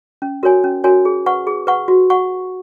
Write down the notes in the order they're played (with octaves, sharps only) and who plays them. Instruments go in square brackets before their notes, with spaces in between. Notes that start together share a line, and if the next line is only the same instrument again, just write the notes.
[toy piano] C#4
F#4 A#4 C#5 G#5
C#4
F#4 A#4 C#5 G#5
G#4
B4 F#5 C#6
G#4
B4 F#5 C#6
F#4
F#5 C#6